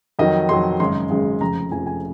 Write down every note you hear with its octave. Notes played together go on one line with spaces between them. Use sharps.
F2 D#3 F#3 D#5
F2 D#3 F#3 C6
G#1 F#2 C#3 G#3 C6
G#1 F#2 C#3 G#3
F1 F2 C#3 F3 A#5
F1 F2 C#3 F3 G#5
G#5